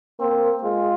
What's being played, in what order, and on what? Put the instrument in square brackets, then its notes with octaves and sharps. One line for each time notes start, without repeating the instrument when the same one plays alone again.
[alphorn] A#3 [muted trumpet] C4
[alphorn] G#3 [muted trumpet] F4